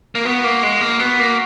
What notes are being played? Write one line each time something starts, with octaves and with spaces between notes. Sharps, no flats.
A#3
B3 F#4
A#3
G#3
A#3
B3 F#4
A#3